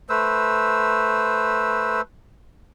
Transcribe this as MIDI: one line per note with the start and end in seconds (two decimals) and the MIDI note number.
0.09 2.01 57
0.09 2.01 71
0.09 2.01 72
0.09 2.01 88